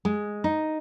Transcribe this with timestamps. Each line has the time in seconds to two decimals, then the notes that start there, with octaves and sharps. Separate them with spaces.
0.05 G#3
0.44 D#4